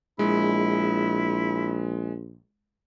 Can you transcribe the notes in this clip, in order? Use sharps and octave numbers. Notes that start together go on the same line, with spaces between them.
A#1 G#3 E4